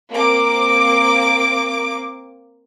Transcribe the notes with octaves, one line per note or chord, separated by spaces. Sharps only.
A#3 C4 D6